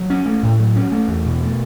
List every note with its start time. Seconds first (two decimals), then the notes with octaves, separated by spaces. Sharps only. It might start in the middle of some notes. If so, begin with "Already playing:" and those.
Already playing: F#3
0.10 C#4
0.26 A3
0.43 A2
0.60 F#3
0.76 C#4
0.92 A3
1.08 E2
1.25 B2
1.41 A3